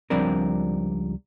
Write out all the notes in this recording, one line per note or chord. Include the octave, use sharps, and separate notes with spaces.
C#2 F3 G3 C4 D4 A#4